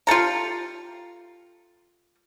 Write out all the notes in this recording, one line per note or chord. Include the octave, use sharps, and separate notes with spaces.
F4 G4 A4 A#5